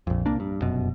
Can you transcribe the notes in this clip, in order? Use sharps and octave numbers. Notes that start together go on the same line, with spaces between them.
A#1 F2
C2 A#3 D4
G2
F1 F#2 B2